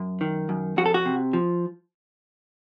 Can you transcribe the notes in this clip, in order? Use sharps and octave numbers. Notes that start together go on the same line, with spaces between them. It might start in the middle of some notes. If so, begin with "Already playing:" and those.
Already playing: F#2
D#3
F#2
F2 F#4
A4
F#4
C3
F3